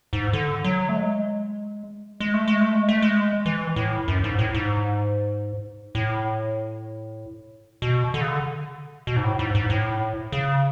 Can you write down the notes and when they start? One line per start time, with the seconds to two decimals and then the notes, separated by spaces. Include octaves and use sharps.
0.13 G#2
0.33 D3
0.64 F#3
0.89 A3
0.96 G#3
2.20 G#3
2.34 A3
2.48 G#3
2.61 A3
2.75 G#3
2.89 A3
3.02 G#3
3.46 E3
3.76 A2
4.08 F#2
4.24 G#2
4.39 A2
4.54 G#2
5.95 A2
7.82 B2
8.14 D3
8.21 C#3
8.28 D3
9.07 B2
9.16 G#2
9.24 A2
9.39 G#2
9.55 G#2
9.70 A2
10.32 C#3